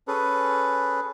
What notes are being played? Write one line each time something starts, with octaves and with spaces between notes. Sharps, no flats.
C#4 G#4 A4 B4